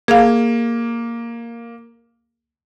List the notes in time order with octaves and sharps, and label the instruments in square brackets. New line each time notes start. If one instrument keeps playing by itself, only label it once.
[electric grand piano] A#3 [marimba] G#4 F5